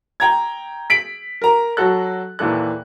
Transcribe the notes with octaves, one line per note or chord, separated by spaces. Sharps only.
G5 A#5 G#6
B6 D7 F#7
A#4 A#5
F#3 F#4 A4 F#6
D#2 A#2 E3 A4 F#6